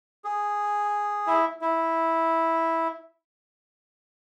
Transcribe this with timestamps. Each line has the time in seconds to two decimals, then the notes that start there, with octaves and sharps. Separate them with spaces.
0.24 G#4
1.27 E4
1.61 E4